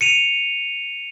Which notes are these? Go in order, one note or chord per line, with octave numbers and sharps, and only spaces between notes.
C#7 D#7 F7